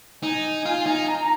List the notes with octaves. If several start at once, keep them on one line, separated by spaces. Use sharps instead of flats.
D#4 G#5
F4
D#4
A#5